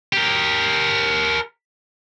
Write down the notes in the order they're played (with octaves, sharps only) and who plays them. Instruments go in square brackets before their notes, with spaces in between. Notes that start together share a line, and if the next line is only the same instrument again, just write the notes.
[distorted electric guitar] G4 A#4